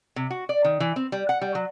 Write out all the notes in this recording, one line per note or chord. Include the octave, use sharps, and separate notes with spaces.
C3
F#4
D5
D#3
E3
C4
G3
F#5
G3
F#3